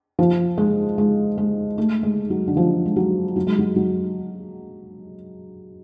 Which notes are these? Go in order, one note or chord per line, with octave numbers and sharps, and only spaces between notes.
F3
G#3
G#3
G#3
A3
G#3
F#3
D3
F3
G#3
F#3
F#3
G#3
F#3
F#3